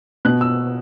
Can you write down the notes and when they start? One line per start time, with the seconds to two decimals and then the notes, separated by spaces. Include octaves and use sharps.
0.25 B2 F#6
0.41 E6